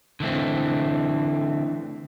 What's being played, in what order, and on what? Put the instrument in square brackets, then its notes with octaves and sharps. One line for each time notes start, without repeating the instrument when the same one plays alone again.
[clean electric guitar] D3 E3 A3 C4